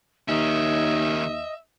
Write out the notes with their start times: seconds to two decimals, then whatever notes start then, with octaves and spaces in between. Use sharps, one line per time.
0.28 D#2 D#3 C#4 D#5 E5